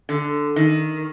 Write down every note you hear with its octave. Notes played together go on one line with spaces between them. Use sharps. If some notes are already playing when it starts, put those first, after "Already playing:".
D3
D#3